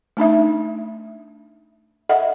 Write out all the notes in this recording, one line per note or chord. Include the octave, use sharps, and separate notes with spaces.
A3 D4 D#4 E5
A4 D#5 E5 F#5